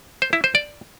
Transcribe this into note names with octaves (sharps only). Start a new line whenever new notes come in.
C5
E4
C5
D5